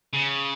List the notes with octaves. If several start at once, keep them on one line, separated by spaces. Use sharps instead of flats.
C#3